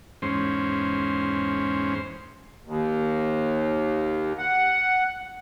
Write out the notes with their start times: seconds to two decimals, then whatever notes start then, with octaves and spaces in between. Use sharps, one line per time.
0.22 E2 G#2 C#4 C5
2.65 D#2
4.39 F#5